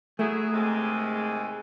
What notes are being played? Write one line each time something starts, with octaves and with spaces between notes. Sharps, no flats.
F#3 A3 E4 G#4
D#2 C3 G#3